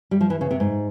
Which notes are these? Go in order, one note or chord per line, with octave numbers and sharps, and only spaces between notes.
G3
F3
E3
C#3
C3
G#2